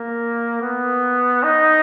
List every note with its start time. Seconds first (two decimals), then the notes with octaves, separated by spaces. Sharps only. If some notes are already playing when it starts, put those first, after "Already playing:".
Already playing: A#3
0.62 B3
1.43 D#4